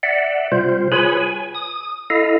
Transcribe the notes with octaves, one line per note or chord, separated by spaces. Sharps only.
D5 E5 F#5
C3 G3 F4 C5
F4 G#4 B4 C#5 G#5 B5
G#5
D#6
E4 A4 D#5 F5